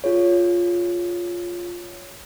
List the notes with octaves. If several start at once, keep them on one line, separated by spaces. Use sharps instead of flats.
F4 G#4 C#5